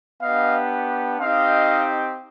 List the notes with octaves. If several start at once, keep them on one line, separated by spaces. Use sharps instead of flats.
B3 D4 G4 D#5 F5
C4 D#4 G4 D#5 F5